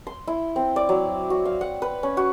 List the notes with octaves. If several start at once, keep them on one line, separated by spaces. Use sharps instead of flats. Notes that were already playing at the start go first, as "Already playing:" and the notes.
C6
E4
C4
D5
F#3
F#4
F5
F#5
B4
C#4
F#4